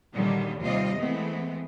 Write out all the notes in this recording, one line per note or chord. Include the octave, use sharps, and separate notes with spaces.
A#2 D3 D#3 F#3 G3
D#2 C3 G3 C4 F4 D#5
E3 G#3 A3 B3 C4